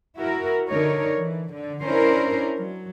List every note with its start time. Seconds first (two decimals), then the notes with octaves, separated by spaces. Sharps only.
0.17 E4 F#4 A#4
0.69 D3 D#4 A#4 C#5
1.17 E3
1.54 D3
1.83 C#4 D4 E4 A#4 C5
2.59 F#3